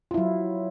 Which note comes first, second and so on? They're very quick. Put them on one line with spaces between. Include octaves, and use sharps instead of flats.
F4 E4 F#3